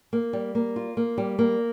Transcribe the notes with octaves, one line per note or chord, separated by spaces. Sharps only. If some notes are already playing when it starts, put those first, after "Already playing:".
A#3
G3
A#3
F4
A#3
G3
A#3